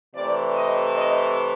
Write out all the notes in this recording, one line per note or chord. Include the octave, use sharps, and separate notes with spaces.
C3 E3 A3 D5
D#5
D#5